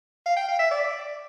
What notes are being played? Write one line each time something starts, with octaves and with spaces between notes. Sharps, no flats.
F5
G5
F5
E5
D5